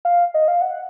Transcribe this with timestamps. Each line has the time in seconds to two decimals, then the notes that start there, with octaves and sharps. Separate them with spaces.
0.05 F5
0.34 D#5
0.48 F5
0.61 F#5